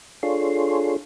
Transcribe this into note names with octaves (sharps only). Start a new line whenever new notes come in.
D4 F4 G#4 A4 C#5 C6